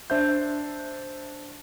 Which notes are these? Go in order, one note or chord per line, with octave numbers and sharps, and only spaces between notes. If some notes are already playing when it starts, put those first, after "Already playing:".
D4 C5 E5 G6